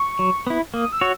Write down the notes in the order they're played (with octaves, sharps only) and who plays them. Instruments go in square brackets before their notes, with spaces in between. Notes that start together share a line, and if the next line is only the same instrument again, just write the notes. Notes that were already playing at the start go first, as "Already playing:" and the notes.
Already playing: [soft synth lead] C#6
[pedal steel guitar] F#3
B3 E4
[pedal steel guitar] A#3 [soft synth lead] D#6
[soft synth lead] E6
[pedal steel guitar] F#4 C#5